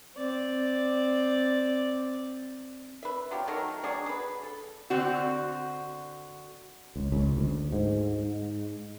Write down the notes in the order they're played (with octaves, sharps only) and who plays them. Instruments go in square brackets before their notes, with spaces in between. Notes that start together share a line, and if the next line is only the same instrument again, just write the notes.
[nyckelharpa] C4 D5
[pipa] B4 E5
F#3 F4 G4
D#3 F#3 A3 A#4
F#3 D4 G#4
G#4 B4
A4
[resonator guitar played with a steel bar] D3 C4 F#4
[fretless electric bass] C#2
C#2
D2
G#2